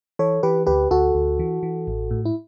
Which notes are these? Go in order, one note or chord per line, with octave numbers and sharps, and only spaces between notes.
E3 A4 C#5
E3 G4 B4
D2 G4 B4
D2 F#4 A4
D2
E3
E3
A1
A2
E4